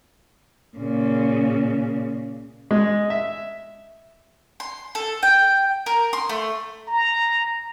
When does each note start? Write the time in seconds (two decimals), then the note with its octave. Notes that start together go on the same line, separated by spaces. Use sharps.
0.77 A#2 C#3
2.71 G#3
3.10 E5
4.60 C6
4.95 A4
5.23 G5
5.86 A#4
6.13 C6
6.29 A3
6.88 A#5